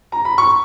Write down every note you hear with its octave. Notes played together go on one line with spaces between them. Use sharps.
A#5
B5
C#6